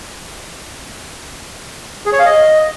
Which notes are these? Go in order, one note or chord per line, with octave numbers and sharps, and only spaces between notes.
G#4
C#5
F5
D#5